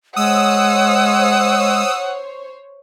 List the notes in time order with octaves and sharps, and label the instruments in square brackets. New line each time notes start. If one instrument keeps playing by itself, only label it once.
[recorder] G#3 [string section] C5 C#5 [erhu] F#5 [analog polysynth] D#6 E6